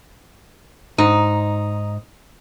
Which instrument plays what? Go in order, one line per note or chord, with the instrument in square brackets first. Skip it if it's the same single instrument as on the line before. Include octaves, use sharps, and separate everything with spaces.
[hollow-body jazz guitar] G#2 [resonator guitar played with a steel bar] D#4